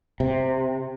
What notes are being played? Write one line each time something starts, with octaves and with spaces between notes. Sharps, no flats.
C3